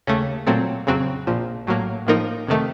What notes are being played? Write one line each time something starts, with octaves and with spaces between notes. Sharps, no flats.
D#2 C#3 A3
A#2 F#3 A3 C4
F2 C#3 F#3 C4 F#4
A#1 A#2 F3
A1 A2 F#3 A#3
A2 F3 A#3 D#4 A#4
F2 C3 D#3 A3